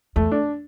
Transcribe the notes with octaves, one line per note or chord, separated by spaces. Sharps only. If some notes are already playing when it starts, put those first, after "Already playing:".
E2 A3
D4